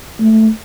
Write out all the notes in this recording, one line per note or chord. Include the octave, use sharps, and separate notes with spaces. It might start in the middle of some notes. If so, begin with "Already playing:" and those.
A3